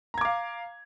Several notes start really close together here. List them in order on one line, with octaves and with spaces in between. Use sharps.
A#5 G#6 D6 F5